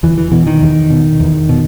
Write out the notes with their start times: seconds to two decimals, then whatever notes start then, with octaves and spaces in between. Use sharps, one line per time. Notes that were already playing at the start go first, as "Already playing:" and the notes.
0.03 E2 E3
0.18 E3
0.32 B2 E3
0.47 D#3
0.61 E2
0.90 B2
1.20 E2
1.49 B2